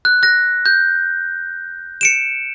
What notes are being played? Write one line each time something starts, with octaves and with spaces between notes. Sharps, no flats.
F#6
F#6 A#6
G6
C#7 D7 E7